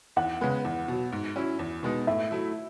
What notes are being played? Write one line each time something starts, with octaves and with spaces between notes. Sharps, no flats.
E2 F#5
C#3 G#3 B3
E2
B2 F#3
G#2
F#3 C#4 E4
E2
B2 G#3 B3 D#4
A2 E5
F#3 A3 E4